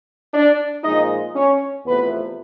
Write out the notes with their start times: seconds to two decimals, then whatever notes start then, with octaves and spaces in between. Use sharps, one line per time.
0.33 D4 D5
0.83 A#2 F3 G#3 D#4 D#5
1.34 C#4 C#5
1.85 E2 C3 F3 A3 B3 B4